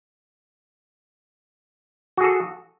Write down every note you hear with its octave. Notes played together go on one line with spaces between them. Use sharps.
F#4 G#4 A4